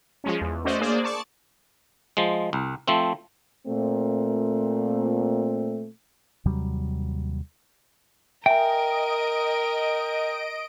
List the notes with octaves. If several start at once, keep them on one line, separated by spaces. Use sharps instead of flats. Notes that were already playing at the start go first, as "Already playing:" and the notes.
F3 G#3 C#4
E2
A3 C#4 F#4 C5 D5 D#5
A#3 D4 G#4 C5 D5
D5 A5 C#6 A6
F3 G#3
C2
F3 A3 C4
A#2 A3 C4
D#2 C3 F#3 G3
A#4 D#5 E5 G5 G#5 D7